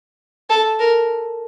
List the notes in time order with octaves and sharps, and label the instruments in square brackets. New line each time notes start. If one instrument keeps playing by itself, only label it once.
[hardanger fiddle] A4
A#4